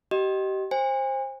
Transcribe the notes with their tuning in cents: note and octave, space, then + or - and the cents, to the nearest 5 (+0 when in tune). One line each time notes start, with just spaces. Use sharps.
G4 -30 D#5 -5
C5 +15 G#5 -40